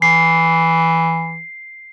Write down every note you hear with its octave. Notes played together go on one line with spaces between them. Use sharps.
E3 C7